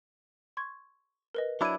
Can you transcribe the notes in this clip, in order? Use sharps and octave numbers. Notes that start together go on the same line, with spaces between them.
C6 C#6 G#6
A#4 B4 D#5
F#3 D4 E4 D6 G#6 D#7